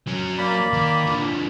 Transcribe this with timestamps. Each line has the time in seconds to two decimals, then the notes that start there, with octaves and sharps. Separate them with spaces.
0.07 F#3 C#4
0.38 A#3 D5 B5
0.73 D#3
1.06 D3 F3